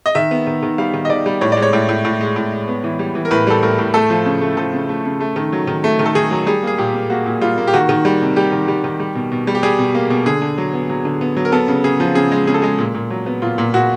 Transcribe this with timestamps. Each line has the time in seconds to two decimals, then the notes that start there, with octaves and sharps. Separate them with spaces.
0.06 D#5
0.15 D#3 E5
0.31 B3
0.47 D#3
0.63 D#3
0.78 G3 F5
0.94 D#3
1.05 D#5
1.09 D#3 D5
1.26 G3
1.41 A2 C#5
1.52 G#3 D5
1.62 C#5
1.73 A2
1.89 A2
2.05 A2
2.21 G#3
2.36 A2
2.52 G#3
2.68 B3
2.84 E3
2.99 G3
3.15 E3
3.25 A#4
3.31 A2 B4
3.47 G3 A4
3.63 A2 A#4
3.79 A2
3.94 A3 A4
4.10 F3
4.26 C#3
4.42 A3
4.57 F3 A4
4.73 C#3
4.89 A3
5.05 C#3
5.20 A3
5.36 D#3
5.52 F#3
5.67 D#3
5.84 A3
5.99 D#3
6.06 A4
6.15 D#3 G#4
6.31 F#3
6.47 G3 G#4
6.63 A#3 G#4
6.78 A#2 G4
6.94 A#3
7.10 A#3 F#4
7.26 A#2
7.41 G3 F4
7.58 A#3
7.67 G4
7.73 D#3 F#4
7.89 D#3
8.05 G3
8.21 C3
8.36 G3 G4
8.52 D#3
8.68 G3
8.84 D#3
9.00 G3
9.15 B2
9.32 B2
9.47 G3
9.55 G4
9.63 G3 G#4
9.79 B2
9.95 A#3
10.10 B2
10.26 D3 G#4
10.42 D3
10.58 F#3
10.73 B3
10.89 F#3
11.05 D3
11.21 B3
11.37 F#3
11.45 A#4
11.52 B3 A4
11.68 C#3
11.84 C#3 G#4
12.00 F3
12.15 C#3 G#4
12.32 G#3
12.47 C#3 G#4
12.54 A4
12.62 G#3 G#4
12.78 A#2
12.95 A#2
13.10 F#3
13.26 B3
13.42 A#2 F4
13.58 A#2
13.74 A#2 F#4